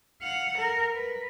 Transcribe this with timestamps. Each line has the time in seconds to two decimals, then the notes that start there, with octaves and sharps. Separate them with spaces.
0.22 F5 F#5
0.58 A#4
0.94 B4